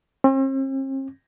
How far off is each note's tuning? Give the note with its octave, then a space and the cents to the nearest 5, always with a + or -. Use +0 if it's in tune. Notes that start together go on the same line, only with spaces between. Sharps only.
C4 +45